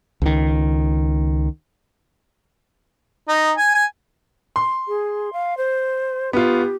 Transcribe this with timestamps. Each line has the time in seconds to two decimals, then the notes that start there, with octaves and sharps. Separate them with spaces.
0.22 C#2 D#3
3.28 D#4
3.57 G#5
3.74 G#5
4.56 C6
4.88 G#4
5.33 F5
5.57 C5
6.33 B3 F4 G4